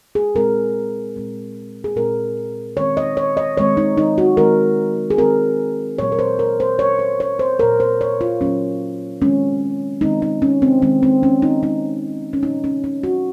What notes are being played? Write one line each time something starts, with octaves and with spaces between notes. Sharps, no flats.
G#4
A#2 G#3 C4 A#4
A#2 G#3 C4
G#4
A#2 G#3 C4 A#4
D#3 G#3 C4 C#5
D#5
C#5
D#5
D#3 G#3 C4 C#5
D#4
D#4
F#4
D#3 G#3 C4 A#4
G#4
D#3 G#3 C4 A#4
A#2 F#3 A#3 C#5
A#4
C5
A#4
C5
A#2 F#3 A#3 C#5
C5
C#5
C5
A#2 F#3 A#3 A#4
C5
C#5
F4
A#2 F#3 A#3 C#4
D#3 G#3 C4 C#4
D#3 G#3 C4 D#4
D#4
C#4
C4
D#3 G#3 C4
C4
C#4
D#4
D#3 G#3 C4 D#4
C#4
A#2 F3 A#3 D#4
C#4
C#4
F#4